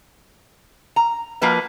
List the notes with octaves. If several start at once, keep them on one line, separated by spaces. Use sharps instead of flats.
A#5
F3 A#3 F#4 B4 D#5